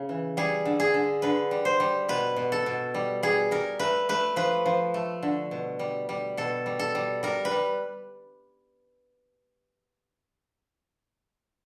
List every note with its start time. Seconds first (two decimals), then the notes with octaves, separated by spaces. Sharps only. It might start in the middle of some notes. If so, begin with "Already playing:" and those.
Already playing: C#3
0.09 E3
0.37 G3 G#4
0.65 D3
0.80 G#4
0.94 D3
1.22 D3 B4
1.51 G3
1.65 C5
1.80 G3
2.09 B2 B4
2.36 B2
2.52 A4
2.66 B2
2.94 G3
3.23 G3 G#4
3.51 G3 A#4
3.79 A3 B4
4.09 A3 B4
4.36 F3 B4
4.66 F3
4.94 A3
5.23 D3
5.51 B2
5.79 G3
6.09 G3
6.37 B2 A4
6.66 G3
6.79 A4
6.95 G3
7.23 G3 A#4
7.45 B4
7.51 G3